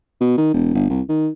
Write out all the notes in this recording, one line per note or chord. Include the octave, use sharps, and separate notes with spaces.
B2
D#3
E1
G1
C2
D#3